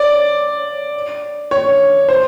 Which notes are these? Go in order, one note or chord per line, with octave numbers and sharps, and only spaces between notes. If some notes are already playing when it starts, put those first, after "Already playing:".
Already playing: D5
C#5
C5